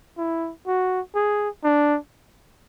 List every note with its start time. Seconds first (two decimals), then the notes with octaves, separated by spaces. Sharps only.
0.18 E4
0.67 F#4
1.15 G#4
1.64 D4